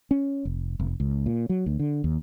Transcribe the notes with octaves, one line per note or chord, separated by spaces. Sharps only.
C#4
F1
F1
C#2
A#2
F#3
D2
D3
D#2